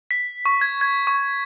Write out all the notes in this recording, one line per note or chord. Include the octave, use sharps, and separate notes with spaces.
B6
C#6
G#6
G#6
C#6